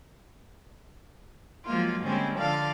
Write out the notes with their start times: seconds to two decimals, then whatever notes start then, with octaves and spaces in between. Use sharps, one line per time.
1.66 F3 F#3 G#3 A#3 F4
2.04 D3 G3 G#3 A#3 C4 C#4
2.38 D3 F3 A4 D5 F5